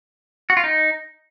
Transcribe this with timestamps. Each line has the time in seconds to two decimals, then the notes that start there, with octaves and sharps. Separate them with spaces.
0.50 F#4
0.57 F4
0.64 D#4